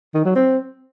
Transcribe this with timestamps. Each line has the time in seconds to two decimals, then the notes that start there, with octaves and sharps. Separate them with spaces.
0.14 D#3
0.25 F#3
0.35 C4